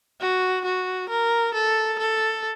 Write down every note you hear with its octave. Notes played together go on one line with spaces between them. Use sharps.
F#4
F#4
A#4
A4
A4